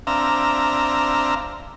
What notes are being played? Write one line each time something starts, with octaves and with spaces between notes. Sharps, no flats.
C4 D4 E5 F5 A#5